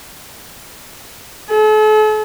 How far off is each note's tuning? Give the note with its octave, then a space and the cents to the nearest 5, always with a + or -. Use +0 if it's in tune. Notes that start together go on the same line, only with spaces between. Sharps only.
A4 -40